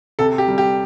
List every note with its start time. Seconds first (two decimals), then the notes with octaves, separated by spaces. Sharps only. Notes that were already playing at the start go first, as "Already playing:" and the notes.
0.19 C3 A4
0.38 G4
0.48 G3
0.58 G4